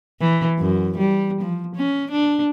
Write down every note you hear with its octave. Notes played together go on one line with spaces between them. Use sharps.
E3
F#2
G3
F3
C#4
D4